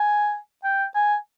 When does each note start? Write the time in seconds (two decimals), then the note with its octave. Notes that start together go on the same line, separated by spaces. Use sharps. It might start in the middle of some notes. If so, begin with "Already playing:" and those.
Already playing: G#5
0.64 G5
0.95 G#5